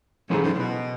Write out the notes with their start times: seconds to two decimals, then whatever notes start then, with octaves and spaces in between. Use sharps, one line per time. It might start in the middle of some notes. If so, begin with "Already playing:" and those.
0.30 G#2 F#3 C#4 E4 A4
0.44 G#2
0.54 C#3
0.58 B2